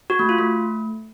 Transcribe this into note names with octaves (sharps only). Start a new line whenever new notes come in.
F#4
A3
F4
A3